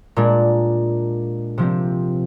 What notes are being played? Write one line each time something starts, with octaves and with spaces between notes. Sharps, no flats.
A#2 G#3 D4
C3 F3 C4